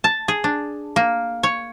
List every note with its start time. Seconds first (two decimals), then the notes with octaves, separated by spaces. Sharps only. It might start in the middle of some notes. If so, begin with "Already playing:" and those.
0.04 A5
0.28 G#4
0.44 D4
0.96 A#3
1.43 C#5